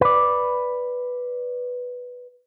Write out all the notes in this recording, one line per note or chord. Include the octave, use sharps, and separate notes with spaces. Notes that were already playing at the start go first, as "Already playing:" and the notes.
B4 D5